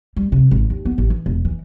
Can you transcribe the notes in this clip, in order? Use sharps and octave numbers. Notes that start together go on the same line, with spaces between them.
G3
C3
G#1
D#2
B3
A1
E3
E1
E3